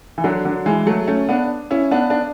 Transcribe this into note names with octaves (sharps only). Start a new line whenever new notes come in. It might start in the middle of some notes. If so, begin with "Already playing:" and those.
E3
D3 F#3
D3 F#3
E3 G#3
F#3 A3
A3 C#4
B3 D4
C#4 E4
B3 D4
D4